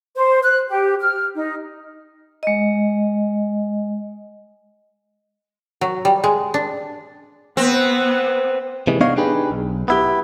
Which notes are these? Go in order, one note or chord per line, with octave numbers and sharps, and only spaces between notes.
C5
F#6
G4
F6
D#4
G#3 D#5
F#3
G3
G#3
D4
B3 C4
C3 E3 G#3
B3 D4 D#4 C#5 D#5 F5
D4 D#4 G4 G#4 B4
B1
B3 E4 G4